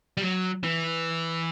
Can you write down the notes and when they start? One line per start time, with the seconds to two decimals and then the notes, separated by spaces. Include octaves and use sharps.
0.17 G3
0.21 F#3
0.64 E3